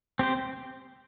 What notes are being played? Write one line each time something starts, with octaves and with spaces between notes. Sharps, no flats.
C4 G4 C5